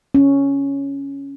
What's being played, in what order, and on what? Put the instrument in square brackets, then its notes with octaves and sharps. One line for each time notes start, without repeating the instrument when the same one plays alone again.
[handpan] C#4